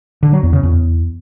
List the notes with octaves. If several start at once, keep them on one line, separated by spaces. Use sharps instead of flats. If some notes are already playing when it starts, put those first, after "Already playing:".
D3
F#3
E2
C#3
E2